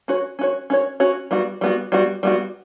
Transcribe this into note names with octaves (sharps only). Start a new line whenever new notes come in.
C#4 F#4 C#5
C#4 F#4 C#5
C#4 F#4 C#5
C#4 F#4 C#5
G3 B3 F#4
G3 B3 F#4
G3 B3 F#4
G3 B3 F#4